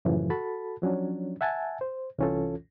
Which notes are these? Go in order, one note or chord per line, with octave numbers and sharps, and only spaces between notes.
F#2 A2 C#3 E3 F3
F#4 A4 A5 B5
F3 F#3 C#4 D4
E5 F#5 G#5 A5
C5
C2 E3 C#4 F4 A4